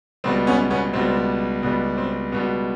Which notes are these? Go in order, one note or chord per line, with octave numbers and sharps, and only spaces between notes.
C#2 B2 G3 C4
B3 C#4
B3 C#4
C#2 B2 G3 C4
C#2 B2 G3 B3
C4
C#2 B2 G3 B3